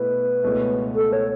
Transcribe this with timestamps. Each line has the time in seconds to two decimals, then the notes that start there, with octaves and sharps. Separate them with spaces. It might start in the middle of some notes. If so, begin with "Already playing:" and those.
Already playing: B2 A3 E4 B4
0.43 C#2 B2 A3 C#4 E4
0.95 A4
1.13 C#5